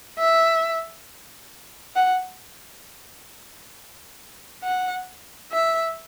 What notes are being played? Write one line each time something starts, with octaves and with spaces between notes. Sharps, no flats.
E5
F#5
F#5
E5